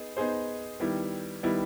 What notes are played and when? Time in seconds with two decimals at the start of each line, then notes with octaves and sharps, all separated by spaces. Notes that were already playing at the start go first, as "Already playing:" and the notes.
Already playing: B3 D#4 G#4
0.17 B3 D#4 G#4 C5
0.80 D#3 G3 B3 E4
1.43 D#3 G3 B3 E4